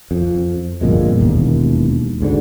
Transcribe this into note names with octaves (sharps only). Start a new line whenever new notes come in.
F2
G1 F2 A#2 G#3
E1 D#2
D2 G#2 D3